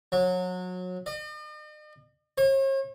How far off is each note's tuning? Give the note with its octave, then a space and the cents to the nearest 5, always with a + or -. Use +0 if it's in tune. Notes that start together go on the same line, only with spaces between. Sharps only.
F#3 -25
D#5 -45
C#5 -45